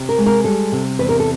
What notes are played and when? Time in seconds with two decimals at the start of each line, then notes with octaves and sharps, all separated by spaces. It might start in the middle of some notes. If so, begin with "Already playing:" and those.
Already playing: C3
0.09 A#4
0.18 G#3
0.26 A#4
0.44 G3 A4
0.72 C3
0.99 E2 B4
1.09 A#4
1.20 A4